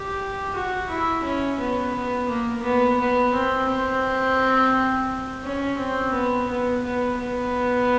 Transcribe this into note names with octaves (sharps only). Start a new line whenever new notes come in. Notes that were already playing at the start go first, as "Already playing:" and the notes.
Already playing: G4
F#4
E4
C#4
B3
B3
A#3
B3
B3
C4
C4
C#4
C4
B3
B3
B3
B3